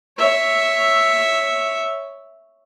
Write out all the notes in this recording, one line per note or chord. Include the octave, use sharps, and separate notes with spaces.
C#5 E5